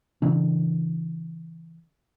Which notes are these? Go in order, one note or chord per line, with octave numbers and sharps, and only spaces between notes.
C#3 E3 D4